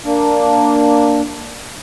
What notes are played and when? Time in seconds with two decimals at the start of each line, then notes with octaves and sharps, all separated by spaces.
0.05 A#3 D4